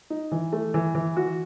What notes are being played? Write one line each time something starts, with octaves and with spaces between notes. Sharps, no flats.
D#4
E3
A3
E3
E3
F#4